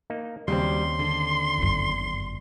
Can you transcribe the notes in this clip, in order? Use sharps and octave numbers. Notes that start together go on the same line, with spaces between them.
A#3 D#4
D#2 C#3 F#3 G3 C4 C6
D3
G1 F#2